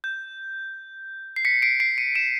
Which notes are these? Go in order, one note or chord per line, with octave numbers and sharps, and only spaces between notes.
G6
C7
B6 C#7
C7 D7
C7 D7
C#7 D#7
D7 E7